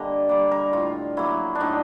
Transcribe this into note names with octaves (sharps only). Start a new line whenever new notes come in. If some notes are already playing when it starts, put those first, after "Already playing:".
Already playing: D3 G3 A#3 D#5
G3 A#3
A#4
A2 F4
F#3 A#3 E4
D4
A2 D#4